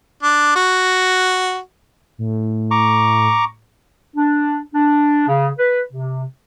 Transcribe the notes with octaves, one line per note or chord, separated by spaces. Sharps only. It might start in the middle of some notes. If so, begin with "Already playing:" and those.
D4
F#4
A2
A#5 C#6 D6
D4
D4
C#3
B4
C3